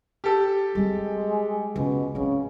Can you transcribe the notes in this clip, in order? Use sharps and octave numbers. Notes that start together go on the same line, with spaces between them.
G4 A4
G3 G#3 C4
C#2 B2
A1 C#3 C4